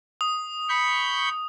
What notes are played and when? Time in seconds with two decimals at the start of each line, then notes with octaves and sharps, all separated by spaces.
0.21 D#6
0.69 B5 C#6 G6